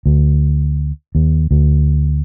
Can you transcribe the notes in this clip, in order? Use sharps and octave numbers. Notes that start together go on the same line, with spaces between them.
D2
D#2
D2